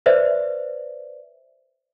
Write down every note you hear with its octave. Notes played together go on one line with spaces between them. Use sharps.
B4 C5 D5 E5